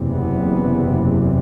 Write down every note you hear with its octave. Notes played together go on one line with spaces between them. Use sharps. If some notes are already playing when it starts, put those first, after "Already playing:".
Already playing: F#1 E2 C3
B3